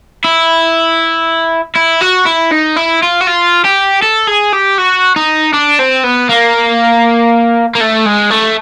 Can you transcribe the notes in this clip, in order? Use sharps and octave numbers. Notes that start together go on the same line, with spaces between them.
E4
E4
F#4
E4
D#4
E4
F4
F#4
F4
G4
A4
G#4
G4
F#4
D#4
D4
C4
B3
A#3
A#3
A3
G#3
A3